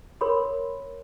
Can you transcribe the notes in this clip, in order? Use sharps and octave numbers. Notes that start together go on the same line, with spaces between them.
A#4 C#5 B5 C6